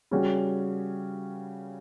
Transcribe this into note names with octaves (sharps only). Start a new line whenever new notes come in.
C#3 G3 C#4 F#4